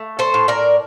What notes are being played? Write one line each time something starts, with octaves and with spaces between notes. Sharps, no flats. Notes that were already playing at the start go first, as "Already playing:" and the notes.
Already playing: A3
A4 C5
A2
A#4 D5